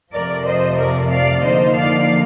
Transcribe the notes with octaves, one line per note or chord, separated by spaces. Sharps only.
F2 C3 F3 A3 A#4 D5
C5 D#5
A#4 D5
D5 F5
D3 F3 A#3 D#4 C5 D#5
D5 F5